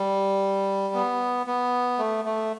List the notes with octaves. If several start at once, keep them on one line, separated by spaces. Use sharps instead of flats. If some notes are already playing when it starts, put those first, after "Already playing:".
Already playing: G3
B3
B3
A3
A3